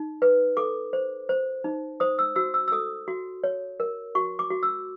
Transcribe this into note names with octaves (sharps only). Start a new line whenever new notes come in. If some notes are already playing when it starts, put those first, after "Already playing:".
Already playing: D#4
B4
A4 D6
C5
C5
D#4
C5 D#6
E6
F#4 E6
E6
E6
A4 D#6
F#4
C#5
A#4
F#4 C#6
D6
F#4
E6